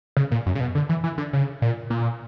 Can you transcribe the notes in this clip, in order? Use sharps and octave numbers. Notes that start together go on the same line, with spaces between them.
C#3
A#2
F#2
C#3
B2
D3
E3
E3
D3
C#3
A#2
A#2